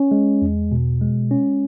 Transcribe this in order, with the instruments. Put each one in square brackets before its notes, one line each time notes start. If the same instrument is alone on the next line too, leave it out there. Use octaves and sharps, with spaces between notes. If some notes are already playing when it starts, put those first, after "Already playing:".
Already playing: [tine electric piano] C#4
G#3
E2
B2
G#3
C#4